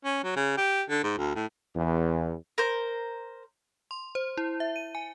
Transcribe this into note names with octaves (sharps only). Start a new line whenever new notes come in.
C#4
F#3
C#3
G4
D3
G#2
D2
A2
E2
A#4 C5
C6
C5
E4
E5
D#7
G#5